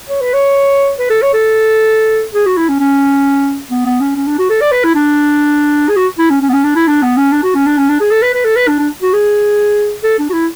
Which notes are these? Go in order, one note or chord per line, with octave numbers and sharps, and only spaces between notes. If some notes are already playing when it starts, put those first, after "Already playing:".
C#5
B4
C#5
B4
A4
C#5
A4
G#4
F#4
E4
C#4
C#4
B3
B3
C#4
C#4
D4
F#4
A4
D5
B4
E4
D4
G#4
F#4
E4
C#4
C#4
B3
C#4
D4
E4
D4
B3
C#4
D4
F#4
C#4
D4
C#4
D4
G#4
A4
B4
B4
A4
B4
D4
D4
F#4
G#4
A4
D4
F#4
E4